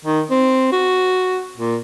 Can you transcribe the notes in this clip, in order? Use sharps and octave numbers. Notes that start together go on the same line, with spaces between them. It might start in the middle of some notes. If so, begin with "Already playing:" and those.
D#3
C4
F#4
A#2